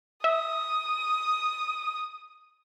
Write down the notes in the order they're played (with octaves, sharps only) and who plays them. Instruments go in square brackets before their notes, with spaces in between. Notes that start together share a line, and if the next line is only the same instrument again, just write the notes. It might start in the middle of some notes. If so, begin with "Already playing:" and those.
[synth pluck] E5 [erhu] D#6